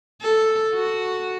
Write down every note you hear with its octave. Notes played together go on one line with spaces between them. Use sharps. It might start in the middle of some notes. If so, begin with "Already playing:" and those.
A4
F#4